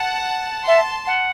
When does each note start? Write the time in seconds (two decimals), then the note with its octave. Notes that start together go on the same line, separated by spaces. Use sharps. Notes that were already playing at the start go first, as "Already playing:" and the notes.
Already playing: F#5 A5
0.67 E5 A5 C6
1.07 F#5